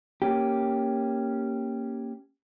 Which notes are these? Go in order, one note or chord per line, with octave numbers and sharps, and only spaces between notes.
A#3 C#4 G4